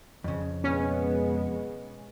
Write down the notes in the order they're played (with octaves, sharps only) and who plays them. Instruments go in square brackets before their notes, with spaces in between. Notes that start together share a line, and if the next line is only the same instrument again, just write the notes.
[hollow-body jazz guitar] F2 C#3
[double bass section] B2 G#3 B3 [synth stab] C#4